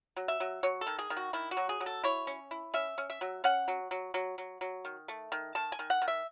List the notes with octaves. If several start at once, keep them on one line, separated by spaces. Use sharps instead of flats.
F#3
E5
F#3
F#3 C#5
A4
D#3
G#4
D#3
F#4
D#3 E4
F#4
F#3
G#4
F#3
A4
E4 C#5
C#4
E4
C#4 E5
C#4
E5
F#3
C#4 F#5
F#3
F#3
F#3
F#3
F#3
D#3
A3
D#3
D#3 A5
G#5
D#3
F#5
D#3
E5